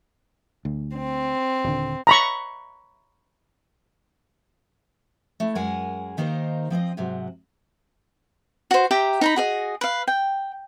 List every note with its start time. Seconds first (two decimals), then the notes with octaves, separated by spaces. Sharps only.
0.65 D2
0.97 C4
1.64 D#1 D3
2.07 A#5 B5 C#6
5.40 A3 E4
5.55 F#2 G#3 A#4 F#5 G#5
6.17 D#2 D#3 A#3 D#4 A#4 C5
6.70 F3 C4 D5 D#5
6.97 G#2 C3 F#3
8.71 F#4 C5
8.91 G4 E5 G5 A#5
9.21 D#4 A#5 B5
9.36 F#4 G#4 D#5
9.81 B4 F5
10.08 G5